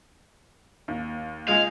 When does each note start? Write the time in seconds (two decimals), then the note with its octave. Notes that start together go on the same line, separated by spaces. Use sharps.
0.88 D#2
1.48 C#2 G#3 F5